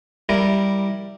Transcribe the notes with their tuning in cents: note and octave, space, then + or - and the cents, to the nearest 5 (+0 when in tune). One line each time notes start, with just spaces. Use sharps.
G3 +0 E4 +0 A#4 +0